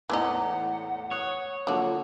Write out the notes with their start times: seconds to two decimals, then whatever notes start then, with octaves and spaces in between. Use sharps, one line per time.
0.10 E2 A2 E3 G#3 D#4 F#5
1.11 C#5 D#6 F#6
1.67 D3 F3 F#3 A#3 F4 F#4